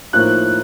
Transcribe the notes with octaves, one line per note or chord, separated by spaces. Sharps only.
A2 F3 A#3 D#4 F#6